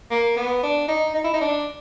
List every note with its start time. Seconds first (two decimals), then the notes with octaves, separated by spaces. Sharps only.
0.11 A#3
0.37 B3
0.63 D4
0.88 D#4
1.15 D#4
1.24 E4
1.33 D#4
1.41 D4